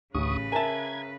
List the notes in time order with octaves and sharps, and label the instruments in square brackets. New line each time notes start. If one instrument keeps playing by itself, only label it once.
[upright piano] A1 [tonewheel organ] D2 C#6 D#6 [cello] C#3 B4
[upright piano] A#4 E5 [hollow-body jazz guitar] G#5 A5 [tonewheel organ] G#6